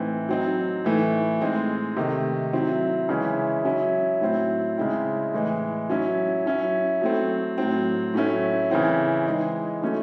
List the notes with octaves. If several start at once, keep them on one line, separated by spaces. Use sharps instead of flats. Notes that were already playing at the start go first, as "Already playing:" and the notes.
Already playing: A2 E3 C4 D#4
F#3 C4 D#4
A2 E3 A3
A2 G#3 C4 D#4
C3 D#3 A3
F#3 C4 E4
C#3 E3 G#3 C#4 E4
F#3 C#4 E4
A2 F#3 C4 E4
C#3 G#3 C4 E4
A2 E3 G#3
F#3 C#4 E4
F#3 C#4 E4
F#3 A3 C4
A2 F#3 C4
A2 F#3 A3 C#4 E4
C#3 E3 C4 E4
E3 G#3 D#4
F#3 A3 C#4 E4